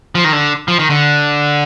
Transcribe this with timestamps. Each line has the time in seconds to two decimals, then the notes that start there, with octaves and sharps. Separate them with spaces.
0.15 F3
0.24 D#3
0.32 D3
0.68 F3
0.79 D#3
0.90 D3